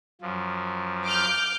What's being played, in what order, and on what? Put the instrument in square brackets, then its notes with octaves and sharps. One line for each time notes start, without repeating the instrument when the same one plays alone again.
[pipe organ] F#2 F3
[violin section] D6 F6 G6